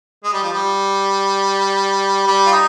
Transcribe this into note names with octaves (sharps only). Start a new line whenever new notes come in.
G#3
G3
F3
G3
G3
F4
D#4